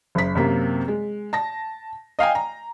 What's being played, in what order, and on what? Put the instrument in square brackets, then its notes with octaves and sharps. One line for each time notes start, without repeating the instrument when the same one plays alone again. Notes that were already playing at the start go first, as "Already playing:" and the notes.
[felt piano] F#1 B6
F#2 C3 A#3
G#3
A5 A#6
D#5 F5 G5 G#5
A#5